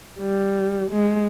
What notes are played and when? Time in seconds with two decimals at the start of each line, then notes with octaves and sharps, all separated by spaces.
0.20 G3
0.91 G#3